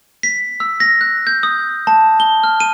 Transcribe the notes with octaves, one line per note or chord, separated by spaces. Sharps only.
B6
E6
A#6
F#6
G6
D#6
A5
G7
F6
D#7